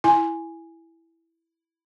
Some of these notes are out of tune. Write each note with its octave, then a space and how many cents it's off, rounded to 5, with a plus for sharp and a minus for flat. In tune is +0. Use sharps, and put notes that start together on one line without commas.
E4 +0 G#5 +0